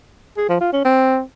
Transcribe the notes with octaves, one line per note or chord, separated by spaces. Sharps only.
G#4
F3
F4
C#4
C4